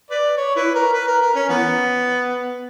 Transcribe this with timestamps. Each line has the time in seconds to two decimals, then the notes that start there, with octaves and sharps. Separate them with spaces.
0.10 B4 D5
0.37 C#5
0.56 E4 B4
0.75 A#4
0.93 B4
1.08 A#4
1.22 A#4
1.35 C#4
1.49 E3 B3